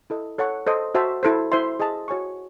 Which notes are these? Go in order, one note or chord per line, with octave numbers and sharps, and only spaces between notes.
E4 A4 D#5
A4 C#5 F#5 C#6
A4 C5 D#5
F#4 C5 E5 A5
E4 A4 C5
E4 C5 E5 C6
G#4 D#5 A5
F#4 C#5 G#5 C#6